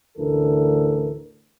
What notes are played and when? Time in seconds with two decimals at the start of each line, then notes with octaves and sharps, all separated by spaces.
0.18 A1 D2 E3 A4 A#4